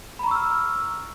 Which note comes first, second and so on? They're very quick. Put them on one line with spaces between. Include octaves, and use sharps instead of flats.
B5 A#5 C#6 E6 F6